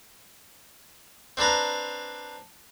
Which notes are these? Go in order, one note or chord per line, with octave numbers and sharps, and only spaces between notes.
C4 D4 B4 A#5